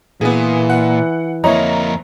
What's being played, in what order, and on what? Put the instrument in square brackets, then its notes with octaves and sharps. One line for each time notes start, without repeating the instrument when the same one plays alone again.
[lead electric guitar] A#2 [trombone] E3 [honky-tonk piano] B3 G#4
[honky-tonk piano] F#5
[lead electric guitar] F2 A#3 [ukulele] E4 C#5 D#5 [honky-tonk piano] A#5